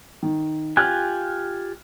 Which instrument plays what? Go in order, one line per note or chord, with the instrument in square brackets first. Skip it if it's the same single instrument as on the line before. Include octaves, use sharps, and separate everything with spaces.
[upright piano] D#3
[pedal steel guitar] F4 G4 G#5 [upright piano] F6 F#6